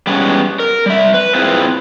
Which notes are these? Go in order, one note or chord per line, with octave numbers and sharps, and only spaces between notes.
G3 G#3 B3 C#4
A#4
G3 E5
B4
C4 E4 F4 G#4 B4 C5